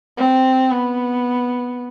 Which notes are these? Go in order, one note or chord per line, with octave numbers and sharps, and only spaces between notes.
C4
B3